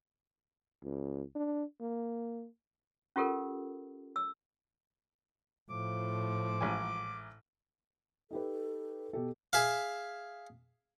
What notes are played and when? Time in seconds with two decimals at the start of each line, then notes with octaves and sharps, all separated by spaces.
0.83 C#2
1.35 D4
1.81 A#3
3.16 C#4 F4 G4 A4 A#4
4.16 E6
5.70 A2 F3 D6
6.61 A1 G#2 G#5
8.31 D#4 G4 A4 B4
9.13 B2 G4 A4
9.53 G#4 E5 F5